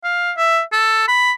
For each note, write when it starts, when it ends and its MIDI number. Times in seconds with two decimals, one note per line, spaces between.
0.04 0.31 77
0.37 0.61 76
0.73 1.04 69
1.08 1.32 83